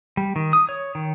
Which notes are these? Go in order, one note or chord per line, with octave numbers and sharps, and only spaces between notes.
G3
D#3
D#6
C#5
D#3